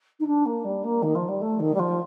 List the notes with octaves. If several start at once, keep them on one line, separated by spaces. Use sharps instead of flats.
D#4
D4
A#3
G3
A#3
D#3
F3
G3
A3
D#3
G3
F3